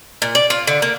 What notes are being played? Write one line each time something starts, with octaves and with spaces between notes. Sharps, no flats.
A#2
D5
F4
D3
A#3